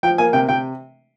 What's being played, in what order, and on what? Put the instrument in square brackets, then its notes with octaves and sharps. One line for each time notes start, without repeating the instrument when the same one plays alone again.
[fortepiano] F3 G5
A#3 G#5
C3 G5
C3 G5